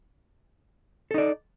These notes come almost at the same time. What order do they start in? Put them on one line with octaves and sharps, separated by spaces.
A4 D#4 D5